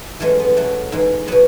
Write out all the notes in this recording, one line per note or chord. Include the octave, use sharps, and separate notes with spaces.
F#2 E3 G#3 A3 C#4
B3
B2 F#3 A3
G#2 E3 G#3
B2 F#3 B3